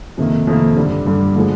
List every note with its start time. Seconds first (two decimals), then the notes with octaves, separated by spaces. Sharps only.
0.17 F2 C3 D#3 A#3
0.47 F2 C3 D#3 A#3
0.77 G2 D3 G3
1.06 G2 D3 G3
1.36 D3 F3 G#3